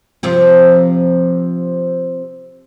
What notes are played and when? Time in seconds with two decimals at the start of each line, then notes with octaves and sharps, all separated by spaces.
0.23 C3 F3 C4